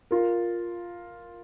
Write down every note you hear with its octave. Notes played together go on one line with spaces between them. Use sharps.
F4 A#4